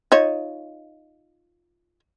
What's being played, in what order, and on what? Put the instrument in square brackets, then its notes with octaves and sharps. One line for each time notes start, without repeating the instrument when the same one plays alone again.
[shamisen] D#4 F4 C#5